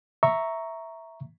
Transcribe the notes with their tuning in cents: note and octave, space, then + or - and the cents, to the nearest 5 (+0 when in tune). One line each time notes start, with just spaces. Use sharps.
E5 +0 A#5 +0 C#6 +0